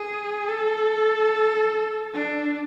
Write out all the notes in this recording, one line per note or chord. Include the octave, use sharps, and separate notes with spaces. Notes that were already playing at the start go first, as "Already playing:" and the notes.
Already playing: G#4
A4
D4